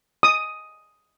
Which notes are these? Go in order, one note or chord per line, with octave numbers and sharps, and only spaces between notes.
D#6